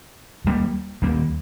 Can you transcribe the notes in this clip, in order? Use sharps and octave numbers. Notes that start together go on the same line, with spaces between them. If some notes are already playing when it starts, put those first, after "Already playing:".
D#2 D#3 G3 A#3
D#2 D#3 G3 A#3